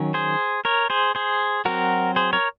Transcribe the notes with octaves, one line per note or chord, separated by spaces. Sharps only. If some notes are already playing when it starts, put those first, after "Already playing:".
Already playing: D#3 F#3 C#4
G#4 C5
A#4 C#5
G#4 C5
G#4 C5
F#3 C4 F#4 A#4
G#4 C5
A#4 C#5